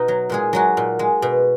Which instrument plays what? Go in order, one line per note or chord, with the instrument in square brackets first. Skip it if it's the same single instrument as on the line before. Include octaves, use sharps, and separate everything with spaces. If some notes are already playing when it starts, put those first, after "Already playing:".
Already playing: [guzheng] B2 D#4 D#5
F#3
A#2 G#3 G#4
F#3 G#3 F#4
A#2
G#3
B2